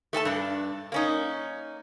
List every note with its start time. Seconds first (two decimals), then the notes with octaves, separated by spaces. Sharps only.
0.13 A3 A4 G#5 A5
0.25 G2 D4
0.92 A#3 C#4 D#4